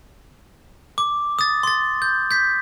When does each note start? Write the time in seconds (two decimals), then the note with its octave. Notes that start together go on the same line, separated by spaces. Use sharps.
0.98 D6
1.39 D#6 A6
1.63 C6 A6
2.02 G6
2.31 G6 B6